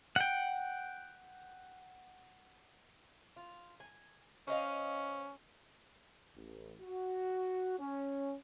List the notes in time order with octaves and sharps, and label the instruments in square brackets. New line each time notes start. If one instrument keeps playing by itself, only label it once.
[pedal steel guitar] F#5 G5
[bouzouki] F4
G#5
[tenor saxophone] C#4 [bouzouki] C5 D#5 F5
[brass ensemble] A1
F#4
C#4